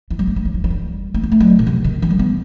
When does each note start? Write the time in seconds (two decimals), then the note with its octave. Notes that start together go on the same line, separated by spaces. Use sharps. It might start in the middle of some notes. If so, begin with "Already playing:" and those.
0.10 E3
0.19 G3
0.28 A3
0.36 G3
0.45 F#3
0.54 E3
0.64 F#3
0.70 G3
1.14 A3
1.23 B3
1.32 A3
1.40 F#3
1.59 B2
1.67 C3
1.84 D#3
2.02 E3
2.10 G3
2.19 B3